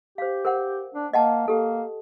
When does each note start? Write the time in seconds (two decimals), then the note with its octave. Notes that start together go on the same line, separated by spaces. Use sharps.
0.18 G4 C5 F5
0.45 A#4 C5 F#5
0.95 D4
1.13 A#3 D#5 F#5 A5
1.48 A#3 G4 A4